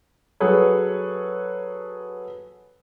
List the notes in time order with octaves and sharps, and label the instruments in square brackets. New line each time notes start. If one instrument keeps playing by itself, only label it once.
[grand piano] F#3 G#4 A4 B4 C#5